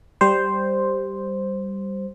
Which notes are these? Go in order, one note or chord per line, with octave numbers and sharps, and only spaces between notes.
G3 C5